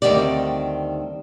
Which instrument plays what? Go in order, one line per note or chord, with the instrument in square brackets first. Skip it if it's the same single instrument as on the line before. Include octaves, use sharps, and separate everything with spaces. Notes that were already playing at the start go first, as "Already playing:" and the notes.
[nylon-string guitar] D2 D#3 G3 C4 D5